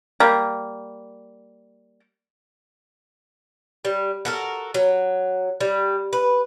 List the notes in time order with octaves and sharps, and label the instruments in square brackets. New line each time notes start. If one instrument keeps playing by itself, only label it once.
[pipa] G3 A#3
[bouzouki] G3
F#4 A4 A#4
F#3
G3
B4